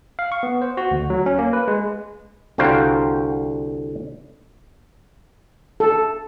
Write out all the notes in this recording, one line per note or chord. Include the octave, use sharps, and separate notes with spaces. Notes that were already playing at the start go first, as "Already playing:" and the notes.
F5
C#6
B3
C5
F#4
D2
F#3
C#4
A#3
B4
G#3
C2 D3 F#4 C5 F5 G5
A4